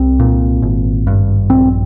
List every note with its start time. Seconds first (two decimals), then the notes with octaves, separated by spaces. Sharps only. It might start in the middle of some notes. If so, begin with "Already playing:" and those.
Already playing: C2 C4
0.20 A#2
0.62 G#1
1.07 G2
1.50 A#1 C4